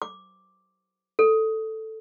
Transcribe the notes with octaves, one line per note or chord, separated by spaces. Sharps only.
D6
A4